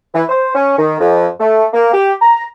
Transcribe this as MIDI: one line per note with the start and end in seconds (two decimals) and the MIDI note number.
0.14 0.23 52
0.29 0.51 72
0.55 0.75 61
0.78 0.95 51
1.00 1.27 41
1.40 1.65 57
1.73 1.88 58
1.93 2.14 67
2.21 2.44 82